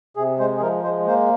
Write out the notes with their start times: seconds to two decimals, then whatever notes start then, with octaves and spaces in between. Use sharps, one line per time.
0.16 C3 G#4
0.39 G#3 C5
0.57 G#4
0.61 F3 A#4
0.84 G#3 C5
1.07 A#3 C5